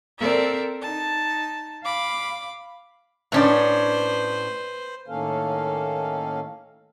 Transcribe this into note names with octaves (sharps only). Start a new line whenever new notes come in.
C4 A4 A#4 D5 E5
D#4 A5
F5 B5 D6
A2 C#4 D4 B4 C5
A2 D#3 A#3 C#4 A4 F5